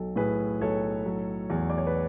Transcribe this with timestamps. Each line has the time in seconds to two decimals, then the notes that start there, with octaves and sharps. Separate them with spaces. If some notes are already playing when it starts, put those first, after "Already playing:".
Already playing: B1 F#3 A4
0.16 A2 G#4 B4
0.61 B1 A4 C#5
1.06 F#3
1.50 E2
1.70 D5
1.78 C#5
1.87 B4